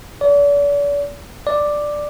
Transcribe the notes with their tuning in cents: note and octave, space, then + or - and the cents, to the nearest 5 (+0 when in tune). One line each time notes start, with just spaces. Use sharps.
D5 -40
D5 +5